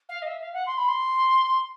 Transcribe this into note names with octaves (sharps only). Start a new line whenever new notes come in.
F5
D#5
E5
F5
F#5
C6
B5
C6